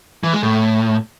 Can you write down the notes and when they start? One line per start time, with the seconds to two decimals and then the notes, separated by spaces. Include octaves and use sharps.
0.23 E3
0.33 G#3
0.43 A2